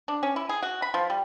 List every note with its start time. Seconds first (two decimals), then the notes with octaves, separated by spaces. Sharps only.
0.08 D4
0.23 C#4
0.36 E4
0.49 G#4
0.62 F#4
0.82 B5
0.94 F3
1.10 G3